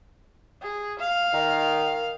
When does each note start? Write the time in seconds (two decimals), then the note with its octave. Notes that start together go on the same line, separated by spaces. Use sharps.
0.62 G#4
0.99 F5
1.33 D#3